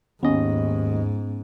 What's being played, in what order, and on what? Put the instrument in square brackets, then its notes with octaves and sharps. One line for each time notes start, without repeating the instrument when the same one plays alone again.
[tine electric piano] D#2 D#5 [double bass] G#2 [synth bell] B3 C#4